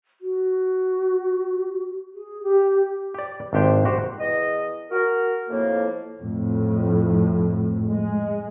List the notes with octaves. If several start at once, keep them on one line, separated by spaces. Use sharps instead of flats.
F#4
G#4
G4
G4 D5
G#1 D4 G4 C5 G5
F#4 G4 C5
E2 D#5
F#4 A#4
F2 A2 A#3
F2 A2
G#3